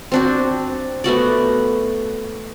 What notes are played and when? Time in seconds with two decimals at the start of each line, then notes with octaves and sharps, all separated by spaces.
0.12 C4 D4 F#4
1.04 A3 B3 F#4 D5